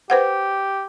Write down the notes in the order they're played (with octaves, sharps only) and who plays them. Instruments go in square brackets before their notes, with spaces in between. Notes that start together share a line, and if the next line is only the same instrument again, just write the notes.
[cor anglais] G4 [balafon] B4 C5 F#5